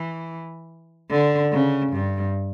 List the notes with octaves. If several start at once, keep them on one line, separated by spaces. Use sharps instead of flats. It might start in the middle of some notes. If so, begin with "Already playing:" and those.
Already playing: E3
D3
C#3
G2